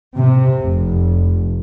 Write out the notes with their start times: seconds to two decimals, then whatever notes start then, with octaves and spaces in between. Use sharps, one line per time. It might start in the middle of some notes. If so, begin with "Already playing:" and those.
0.16 C3
0.60 F1